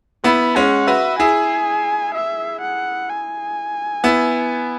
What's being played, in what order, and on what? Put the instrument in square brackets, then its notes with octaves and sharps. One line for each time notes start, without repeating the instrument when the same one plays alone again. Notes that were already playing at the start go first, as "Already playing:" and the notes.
[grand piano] B3 E4 [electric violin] B5
[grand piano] G#3 C#4 [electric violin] F#5
[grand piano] F#4 B4 [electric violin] E5
[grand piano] E4 G#4 [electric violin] G#5
[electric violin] E5
F#5
G#5
[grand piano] B3 E4